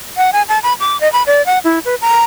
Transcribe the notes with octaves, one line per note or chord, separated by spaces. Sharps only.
F#5
G#5
A5
B5
D6
D#5
B5
D5
F#5
E4
B4
A#5